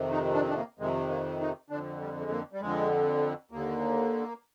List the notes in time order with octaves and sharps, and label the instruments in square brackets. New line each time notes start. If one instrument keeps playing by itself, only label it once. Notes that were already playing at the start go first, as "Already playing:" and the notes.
Already playing: [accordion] F2 C3 D#3
D#4
D4
C4
D4
A#3
F2 C3 D#3 G#3
A#3
D#4
F2 D3 D4
G3
G#3
A#3
G3
F2 D3 G#3
D#2 D3 A#3